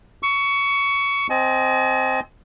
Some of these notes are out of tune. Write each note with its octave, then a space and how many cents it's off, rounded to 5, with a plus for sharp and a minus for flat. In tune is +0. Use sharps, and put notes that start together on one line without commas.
C#6 +20 E6 +0
C4 +0 D#5 +5 G#5 +40